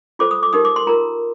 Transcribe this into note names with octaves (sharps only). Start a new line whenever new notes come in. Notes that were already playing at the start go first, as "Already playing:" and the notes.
F4 A4 C5 D6
D#6
D6
D#4 G4 A#4 D#6
D6
C6
F4 A#4 A#5